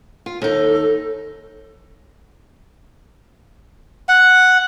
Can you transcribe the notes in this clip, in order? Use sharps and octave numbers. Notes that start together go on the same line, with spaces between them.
F4
D#2 D#4 A4
F#5